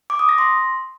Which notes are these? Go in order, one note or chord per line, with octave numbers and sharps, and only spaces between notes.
D6
D#6
A#6
C6